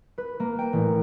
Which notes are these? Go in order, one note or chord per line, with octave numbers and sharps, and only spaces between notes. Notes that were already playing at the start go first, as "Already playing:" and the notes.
B4
A#3
G5
A1